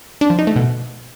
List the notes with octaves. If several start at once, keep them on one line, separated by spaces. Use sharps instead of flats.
D4
F3
D#4
A3
B2